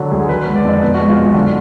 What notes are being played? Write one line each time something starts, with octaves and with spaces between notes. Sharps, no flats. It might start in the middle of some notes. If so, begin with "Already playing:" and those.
Already playing: D3 F#3
D2 G#4
D#3 B4
B4
G#3
D5
F2 D#5
B2 B4
F#4
G#3
F4
B1
D3 D4